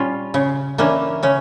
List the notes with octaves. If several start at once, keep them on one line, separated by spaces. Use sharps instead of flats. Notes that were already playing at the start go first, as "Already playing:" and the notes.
Already playing: A#2 G3 C#4 F4
C#3
E3 A#3 C#4 D4
C#3 C#4